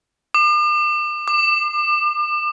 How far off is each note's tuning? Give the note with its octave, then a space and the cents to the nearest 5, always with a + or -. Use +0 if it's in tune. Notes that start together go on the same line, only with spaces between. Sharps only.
D6 +45
D6 +35